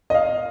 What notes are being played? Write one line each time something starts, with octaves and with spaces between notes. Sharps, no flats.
D#5
F5